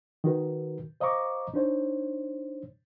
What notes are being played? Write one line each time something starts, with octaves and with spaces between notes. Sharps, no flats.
D#3 D#4 F#4 A#4 B4
C5 D#5 F5 A#5 C#6 D6
D4 D#4 C5 C#5